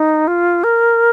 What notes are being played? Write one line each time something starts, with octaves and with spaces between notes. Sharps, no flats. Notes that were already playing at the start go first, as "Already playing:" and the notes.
Already playing: D#4
F4
A#4